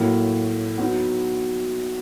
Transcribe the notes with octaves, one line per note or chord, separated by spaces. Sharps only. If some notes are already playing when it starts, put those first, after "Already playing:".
Already playing: A2 F#3 A#3
F#3 B3 D#4 F#4